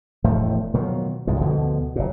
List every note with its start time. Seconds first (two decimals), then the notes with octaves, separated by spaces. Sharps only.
0.24 E1 A2 F3 A3
0.74 B2 D#3 F3 F#3
1.27 C2 G2 A#2 G#3
1.40 D2 B2 D3 F3
1.96 F#1 A#2